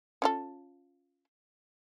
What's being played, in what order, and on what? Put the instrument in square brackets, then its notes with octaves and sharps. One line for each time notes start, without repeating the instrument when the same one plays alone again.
[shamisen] C#4 F4 A4